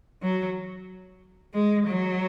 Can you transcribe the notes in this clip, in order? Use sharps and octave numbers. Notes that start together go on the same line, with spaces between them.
F#3
G#3
F#3